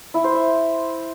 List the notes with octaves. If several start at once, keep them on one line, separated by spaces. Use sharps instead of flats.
E4
C5
E5